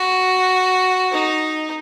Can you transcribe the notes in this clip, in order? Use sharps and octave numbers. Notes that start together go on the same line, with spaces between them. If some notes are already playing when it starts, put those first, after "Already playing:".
Already playing: F#4
D#4